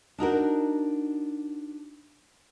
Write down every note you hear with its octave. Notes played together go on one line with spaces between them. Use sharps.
D4 D#4 F#4 A#4